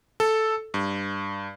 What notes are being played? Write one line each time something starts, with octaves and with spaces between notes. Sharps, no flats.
A4
G2